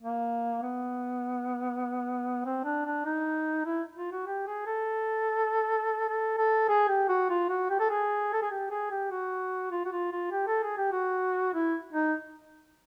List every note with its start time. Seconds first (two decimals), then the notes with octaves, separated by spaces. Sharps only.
0.03 A#3
0.63 B3
2.45 C4
2.64 D4
2.86 D4
3.05 D#4
3.65 E4
3.96 F4
4.12 F#4
4.27 G4
4.47 G#4
4.66 A4
6.09 A4
6.38 A4
6.69 G#4
6.89 G4
7.09 F#4
7.30 F4
7.49 F#4
7.70 G4
7.80 A4
7.90 G#4
8.33 A4
8.42 G#4
8.51 G4
8.71 G#4
8.90 G4
9.11 F#4
9.72 F4
9.85 F#4
9.92 F4
10.12 F4
10.31 G4
10.48 A4
10.63 G#4
10.77 G4
10.92 F#4
11.54 E4
11.93 D#4